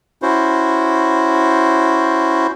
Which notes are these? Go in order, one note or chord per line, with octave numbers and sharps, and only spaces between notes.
C#4 E4 F#4 C5